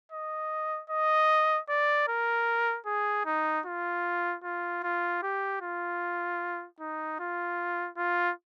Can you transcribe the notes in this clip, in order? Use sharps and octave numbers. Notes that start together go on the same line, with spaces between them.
D#5
D#5
D5
A#4
G#4
D#4
F4
F4
F4
G4
F4
D#4
F4
F4